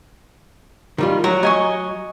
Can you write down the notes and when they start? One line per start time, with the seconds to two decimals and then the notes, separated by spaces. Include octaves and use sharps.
0.98 D#3 G3 F4
1.24 F#3 A#5
1.43 D#5 G#5 C#6